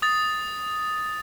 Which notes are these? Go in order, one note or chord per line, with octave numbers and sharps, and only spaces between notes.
D#6 A6